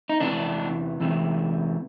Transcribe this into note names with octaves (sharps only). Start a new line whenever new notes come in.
D#4
E2 C3 E3 D4
E2 C3 E3